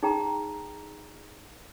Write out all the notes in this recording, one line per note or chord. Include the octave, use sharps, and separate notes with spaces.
D#4 G#4 G5 A#5